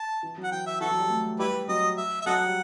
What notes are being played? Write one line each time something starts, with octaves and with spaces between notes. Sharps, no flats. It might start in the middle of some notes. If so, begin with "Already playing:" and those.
Already playing: A5
E3
F#3
F#5
E3 G5
E5
E3 F#4 A4
F#3
G3
A3
G3 E4 G4 B4
F#3 D#5
E5
E5
F#3 A4 D#5 F#5
G3